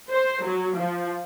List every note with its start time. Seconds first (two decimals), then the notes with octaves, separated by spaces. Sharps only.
0.10 C5
0.44 F#3
0.77 F3